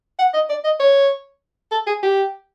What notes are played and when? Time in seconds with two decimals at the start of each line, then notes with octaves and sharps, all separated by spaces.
0.19 F#5
0.34 D#5
0.49 D5
0.64 D#5
0.80 C#5
1.71 A4
1.87 G#4
2.03 G4